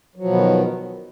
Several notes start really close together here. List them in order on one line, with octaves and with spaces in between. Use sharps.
F#3 F3 B2 B3 D#3